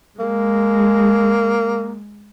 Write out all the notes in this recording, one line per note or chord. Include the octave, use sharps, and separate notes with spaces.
G#3 A#3